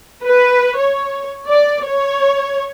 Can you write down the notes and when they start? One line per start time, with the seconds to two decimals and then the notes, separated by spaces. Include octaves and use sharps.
0.24 B4
0.78 C#5
1.47 D5
1.85 C#5